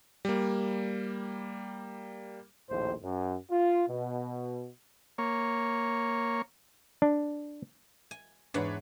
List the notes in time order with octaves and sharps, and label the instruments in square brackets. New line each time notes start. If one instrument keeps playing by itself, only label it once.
[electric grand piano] G3 A#3
[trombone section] A#1 D#2 A2 C5
F#2
F4
B2
[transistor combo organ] A#3 C#5
[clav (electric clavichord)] D4
[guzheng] G#5
[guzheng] E2 G#2 F#5 [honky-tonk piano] D4 B4 C#5